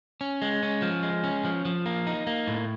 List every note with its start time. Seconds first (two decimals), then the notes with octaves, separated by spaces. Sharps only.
0.21 C#4
0.42 G#3
0.63 C#4
0.82 F3
1.03 G#3
1.24 C#4
1.45 F3
1.65 F3
1.86 A#3
2.07 D#4
2.27 A#3
2.47 A2